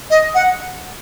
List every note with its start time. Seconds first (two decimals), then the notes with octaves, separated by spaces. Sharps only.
0.11 D#5
0.35 F#5